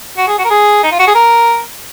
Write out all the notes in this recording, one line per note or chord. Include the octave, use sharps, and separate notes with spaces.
F#4
G#4
F#4
A#4
G#4
D#4
F4
F#4
G#4
A#4